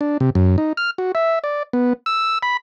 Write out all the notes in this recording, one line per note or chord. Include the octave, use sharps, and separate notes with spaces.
D4
C3
F#2
D#4
F6
F#4
E5
D5
B3
E6
B5